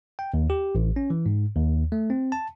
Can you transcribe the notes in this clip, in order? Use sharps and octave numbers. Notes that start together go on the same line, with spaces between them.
G5
D#2
G4
A1
C#4
E3
G#2
D#2
A3
C4
A5